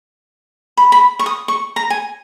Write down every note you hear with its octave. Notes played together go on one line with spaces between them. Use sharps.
B5
B5
C#6
D#6
C#6
A#5
G#5